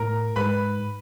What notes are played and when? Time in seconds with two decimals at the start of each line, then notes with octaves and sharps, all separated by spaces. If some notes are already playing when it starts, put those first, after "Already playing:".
Already playing: A2 A#4 A#5
0.36 G#2 B4 B5